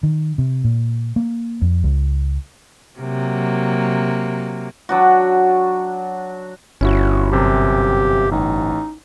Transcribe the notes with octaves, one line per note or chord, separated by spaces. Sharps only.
D#3
C3
A#2
A#3
F2
C#2
C3 F#3 A#3
F#3 D4 F#4
G1 C#4 E4 F#4
F#2 C3 G4
A1 D#4